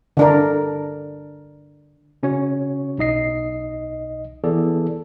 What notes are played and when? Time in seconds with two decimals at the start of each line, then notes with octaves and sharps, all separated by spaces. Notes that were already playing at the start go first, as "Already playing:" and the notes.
0.17 D3 D4 A#4
2.23 C#3 C#4 F#4 C#5
2.98 B1 D#4 D#5 C7
4.44 E3 B3 E4 G#4 A4 D5